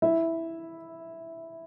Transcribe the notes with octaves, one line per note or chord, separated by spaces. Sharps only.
E4 E5